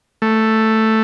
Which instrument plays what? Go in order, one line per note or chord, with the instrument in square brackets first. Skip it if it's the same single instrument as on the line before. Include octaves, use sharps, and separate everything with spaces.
[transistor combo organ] A3